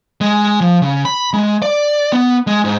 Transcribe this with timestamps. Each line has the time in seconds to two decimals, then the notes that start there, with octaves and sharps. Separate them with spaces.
0.21 G#3
0.61 F3
0.82 C#3
1.05 B5
1.33 G#3
1.62 D5
2.12 B3
2.47 G#3
2.65 G#2